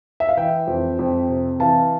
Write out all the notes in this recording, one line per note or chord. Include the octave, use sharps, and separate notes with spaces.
E5
F5
E3 E5 G5
F2
F2
C3
E3 F5 A5